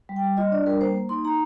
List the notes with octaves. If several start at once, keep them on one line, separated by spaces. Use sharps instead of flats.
G3
G5
G3
F4 D#5
D4 D5
G3 A#4
A#3 C5
A#3
D#4 C6
D#4 A#5